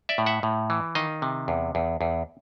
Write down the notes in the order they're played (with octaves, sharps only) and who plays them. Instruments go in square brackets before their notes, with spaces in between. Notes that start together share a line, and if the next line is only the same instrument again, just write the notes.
[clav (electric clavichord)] D5 E5
A2
E5 F#5
A2
E3
D#3 D#5 F5
C3
E2
E2
E2